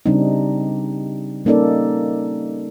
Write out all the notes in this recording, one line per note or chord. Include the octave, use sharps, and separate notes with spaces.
C#3 G3 C4 D4 D#4
G3 A#3 C#4 D#4 A4 D5